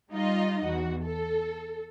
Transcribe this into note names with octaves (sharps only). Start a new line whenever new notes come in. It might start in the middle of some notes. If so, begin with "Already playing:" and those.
G3 D#4 F4 D#5
E2 F#4
A4